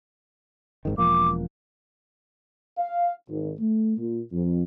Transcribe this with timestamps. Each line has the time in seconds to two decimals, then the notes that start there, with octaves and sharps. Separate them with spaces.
0.85 G#1 G#2 D#3
0.98 E1 F3 A#3 D6
2.78 F5
3.29 G#1
3.60 A3
3.97 A#2
4.32 F2